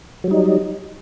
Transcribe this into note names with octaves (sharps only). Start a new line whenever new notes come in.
F#3 G3 D#4